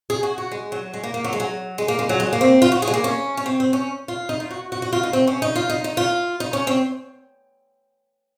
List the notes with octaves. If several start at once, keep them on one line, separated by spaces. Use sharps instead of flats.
G#4
F#4
F#4
G#3
F#3
G#3
A#3
A#3
F#3
G#3
F#3
G#3
A#3
G#3
F#3
G#3
A#3
C4
F4
F#4
G#4
G#3
A#3
C#4
C#4
C4
C4
C#4
F4
D#4
F4
F#4
F#4
F#4
F4
D#4
C4
C#4
D#4
F4
D#4
D#4
F4
D#4
C#4
C4